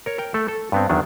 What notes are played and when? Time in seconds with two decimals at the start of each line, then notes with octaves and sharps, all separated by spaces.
0.06 A#4 C#5
0.18 A#4 G5
0.34 A3 A4
0.48 A4
0.72 G2 B3 C4
0.89 E2 D#3 F#3 D4